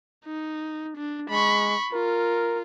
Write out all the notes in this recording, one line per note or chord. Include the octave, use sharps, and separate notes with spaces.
D#4
D4
G#3 B5 C#6
F4 A#4